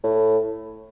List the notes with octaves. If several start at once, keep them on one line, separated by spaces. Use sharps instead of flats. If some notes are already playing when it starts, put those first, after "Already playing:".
A2